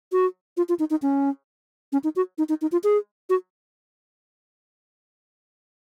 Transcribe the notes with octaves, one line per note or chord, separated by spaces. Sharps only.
F#4
F4
F4
D#4
D#4
C#4
C#4
D#4
F#4
D#4
D#4
D#4
F4
G#4
F#4